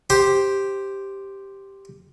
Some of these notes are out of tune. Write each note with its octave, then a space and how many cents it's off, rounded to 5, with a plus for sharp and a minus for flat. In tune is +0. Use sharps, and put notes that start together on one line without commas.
G4 +0 C5 +0